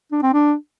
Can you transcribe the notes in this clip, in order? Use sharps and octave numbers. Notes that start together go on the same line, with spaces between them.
D4
C4
D4